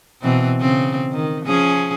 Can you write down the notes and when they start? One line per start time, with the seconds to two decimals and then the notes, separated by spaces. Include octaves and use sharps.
0.23 B2 E3 C4
0.61 C#3 C4
1.12 D#3
1.45 F3 C#4 G#4